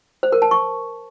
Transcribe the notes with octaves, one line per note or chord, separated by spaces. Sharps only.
C5
A#4
A5
C#6